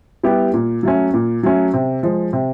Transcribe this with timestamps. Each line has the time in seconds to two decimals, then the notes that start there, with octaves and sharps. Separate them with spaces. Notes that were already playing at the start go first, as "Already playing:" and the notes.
0.23 G3 B3 E4 G4
0.54 A#2
0.83 F#3 A3 C#4
1.14 A#2
1.43 F#3 A3 C#4
1.73 C3
2.03 F3 G#3
2.33 C3